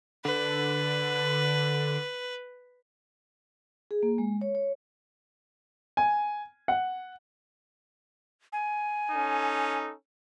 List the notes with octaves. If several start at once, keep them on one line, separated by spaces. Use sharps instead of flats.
D3 B4
G#4
A#3
G#3
C#5
C#5
G#5
F#5
G#5
C#4 D#4 A4